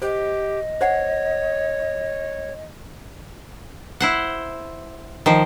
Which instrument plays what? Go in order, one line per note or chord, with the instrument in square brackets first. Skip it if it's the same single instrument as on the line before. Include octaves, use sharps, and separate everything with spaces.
[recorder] G4 [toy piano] C5 [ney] D#5
[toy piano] C5 F#5 [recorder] C#5
[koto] E4 C5 F#5
D#3 F3 C5